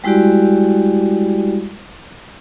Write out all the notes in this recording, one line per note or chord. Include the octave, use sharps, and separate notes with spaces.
G3 G#3 E4 F#4 G4 D5